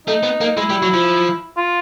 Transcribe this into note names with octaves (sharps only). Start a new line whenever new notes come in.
A3 D#4
B3
A#3
D#4
G#3 E4
G3
F#3
F3
F4